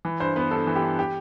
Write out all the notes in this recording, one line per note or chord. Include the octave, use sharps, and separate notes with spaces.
E3
G2 C5
B3 B4
G2 A4
E3
G4
G2
G4